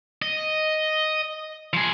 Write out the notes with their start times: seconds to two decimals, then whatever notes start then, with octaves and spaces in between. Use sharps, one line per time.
0.22 D#5
1.74 F3 G#4